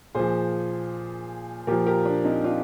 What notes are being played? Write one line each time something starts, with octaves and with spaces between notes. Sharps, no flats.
A#2 F3 G#4 C5
A#2 F3 G4 A#4
G4 A#4
D4
C4 D#4
D4 F4